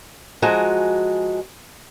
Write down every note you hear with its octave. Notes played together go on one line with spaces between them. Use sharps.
F3 G#3 F#4 G#5 A#5